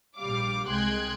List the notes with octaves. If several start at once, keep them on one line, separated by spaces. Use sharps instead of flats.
A#1 G3 F5 D6
C2 G#3 G5 C6 F#6 G#6